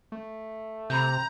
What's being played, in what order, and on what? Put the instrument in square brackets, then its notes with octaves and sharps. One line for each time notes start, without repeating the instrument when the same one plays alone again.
[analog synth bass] A3
[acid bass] C3 [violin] A#5 [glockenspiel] B5 G6